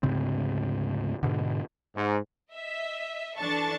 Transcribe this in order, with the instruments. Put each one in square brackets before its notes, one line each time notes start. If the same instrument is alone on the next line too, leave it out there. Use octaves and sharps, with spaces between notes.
[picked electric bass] D2 G#2 C#3 C4
G#2 B2 D3
[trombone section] G#2
[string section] D#5 E5
E3 D4 A4 A5 C#6 A6